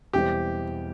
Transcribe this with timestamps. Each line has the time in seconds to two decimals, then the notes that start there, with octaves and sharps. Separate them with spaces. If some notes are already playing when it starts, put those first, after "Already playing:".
0.13 E1 E2 E3 G3 C4 G4